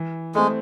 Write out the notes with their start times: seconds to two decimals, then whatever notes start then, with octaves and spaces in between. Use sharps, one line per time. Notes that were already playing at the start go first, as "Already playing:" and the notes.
Already playing: E3
0.35 G#3 A3 C4